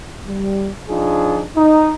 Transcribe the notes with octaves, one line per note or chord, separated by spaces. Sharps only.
G3
F3 D4 D#4 F4 G#4
D#4